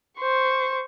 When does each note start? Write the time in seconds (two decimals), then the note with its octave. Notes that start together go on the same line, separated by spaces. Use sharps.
0.19 C5 C#6